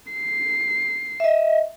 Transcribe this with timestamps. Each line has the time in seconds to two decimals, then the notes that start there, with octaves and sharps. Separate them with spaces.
0.13 C7
1.20 D#5 E5